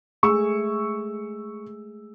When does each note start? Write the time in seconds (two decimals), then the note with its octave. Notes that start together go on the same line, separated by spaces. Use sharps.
0.23 G#3 A3 G#4 C#6 E6